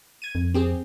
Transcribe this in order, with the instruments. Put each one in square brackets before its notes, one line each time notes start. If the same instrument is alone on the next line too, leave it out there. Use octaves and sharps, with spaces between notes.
[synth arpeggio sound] G#6 D#7
[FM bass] F2
[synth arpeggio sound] C4 G4 G#4